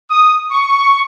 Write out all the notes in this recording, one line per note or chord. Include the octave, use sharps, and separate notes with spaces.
D#6
C#6